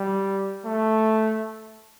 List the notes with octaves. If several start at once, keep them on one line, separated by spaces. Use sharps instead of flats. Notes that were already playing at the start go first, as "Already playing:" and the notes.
Already playing: G3
A3